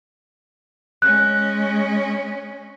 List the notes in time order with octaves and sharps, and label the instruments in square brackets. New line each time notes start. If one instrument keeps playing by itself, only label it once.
[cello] G#3 C#4 [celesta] F#6